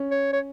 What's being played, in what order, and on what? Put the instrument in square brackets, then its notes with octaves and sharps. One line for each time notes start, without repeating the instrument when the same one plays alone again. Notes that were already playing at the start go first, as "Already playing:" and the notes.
Already playing: [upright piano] C#4
[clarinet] C#5
C#5